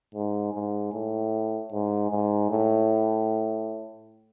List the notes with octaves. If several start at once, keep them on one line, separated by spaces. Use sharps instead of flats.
G#2
G#2
A2
G#2
G#2
A2